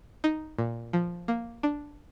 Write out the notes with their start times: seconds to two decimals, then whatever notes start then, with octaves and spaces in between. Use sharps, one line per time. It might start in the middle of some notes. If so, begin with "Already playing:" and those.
0.24 D#4
0.58 A#2
0.93 F3
1.28 A#3
1.63 D4